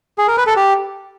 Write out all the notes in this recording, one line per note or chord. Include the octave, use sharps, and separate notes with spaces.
G#4
A#4
B4
A4
G4